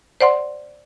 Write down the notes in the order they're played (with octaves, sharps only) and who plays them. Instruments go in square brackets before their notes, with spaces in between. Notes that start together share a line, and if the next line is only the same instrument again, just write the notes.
[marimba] C5 D5 F#5 C6